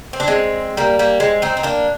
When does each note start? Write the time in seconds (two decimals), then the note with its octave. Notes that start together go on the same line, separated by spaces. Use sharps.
0.13 C4
0.20 D4
0.28 G#3 C4
0.77 G3 A#3
0.99 G3 A#3
1.20 G#3 C4
1.42 C4 D#4
1.57 D#4
1.63 A#3 D4